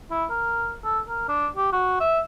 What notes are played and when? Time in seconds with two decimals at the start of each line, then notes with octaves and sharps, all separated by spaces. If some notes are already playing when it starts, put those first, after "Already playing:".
0.11 E4
0.30 A#4
0.84 A4
1.08 A#4
1.29 D4
1.57 G4
1.73 F#4
2.01 E5